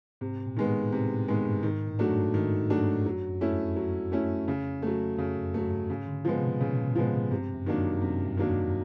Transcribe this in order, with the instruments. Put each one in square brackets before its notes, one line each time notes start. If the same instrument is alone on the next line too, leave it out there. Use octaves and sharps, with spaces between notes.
[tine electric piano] G#2 [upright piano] C3
[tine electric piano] A#2
[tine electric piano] A2 [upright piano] D#3 G#3 B3
[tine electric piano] A2 [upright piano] C3
[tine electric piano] A2
[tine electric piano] G#2 [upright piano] D#3 G#3 B3
[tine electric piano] G2
[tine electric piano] G#2 [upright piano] D#3
[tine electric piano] A2
[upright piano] F#3 A3 D4 F#4
[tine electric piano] G2
[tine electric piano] G#2 [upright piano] D#3
[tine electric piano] G#2 [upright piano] F#3 A3 D4 F#4
[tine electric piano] G2
G#2
[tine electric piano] F#2 [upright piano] F#3
[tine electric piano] F#2
[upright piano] A3 C#4 E4
[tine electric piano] F2
[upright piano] F#3
A3 C#4 E4
C#3
F#3 A3
[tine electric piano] F2 [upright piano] C#3
[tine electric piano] F#2
[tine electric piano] G2 [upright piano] F#3 A3
[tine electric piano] G2
[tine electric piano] G#2 [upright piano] C#3
[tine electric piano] D3
[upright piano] F3 G#3 B3
[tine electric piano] C3
B2
[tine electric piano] A#2 [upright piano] C#3
[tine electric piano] B2
A#2
[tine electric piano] G#2 [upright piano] F3 G#3 B3
[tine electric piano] G2 [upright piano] C3
[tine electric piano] F#2
[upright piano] D#3 F#3 A#3 D4
[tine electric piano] F#2
[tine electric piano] F#2 [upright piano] C3
[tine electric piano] G2
[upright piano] D#3 F#3 A#3 D4
[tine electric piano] F2